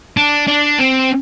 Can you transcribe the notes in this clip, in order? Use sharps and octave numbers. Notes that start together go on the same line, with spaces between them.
D4
D4
C4